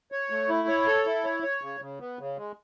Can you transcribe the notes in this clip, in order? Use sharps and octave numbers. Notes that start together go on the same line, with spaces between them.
C#5
A3
E4
C#5
A4
E4
C#5
C#5
C#3
C#3
B3
C#3
G#3